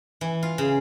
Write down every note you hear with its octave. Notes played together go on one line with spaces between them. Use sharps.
E3
F4
C#3